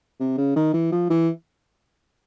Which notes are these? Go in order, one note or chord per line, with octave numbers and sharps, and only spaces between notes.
C3
C#3
D#3
E3
F3
E3